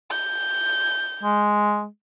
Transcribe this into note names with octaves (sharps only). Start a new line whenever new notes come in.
G6
G#3